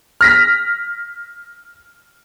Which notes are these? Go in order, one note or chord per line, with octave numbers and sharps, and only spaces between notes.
F6 A#6 B6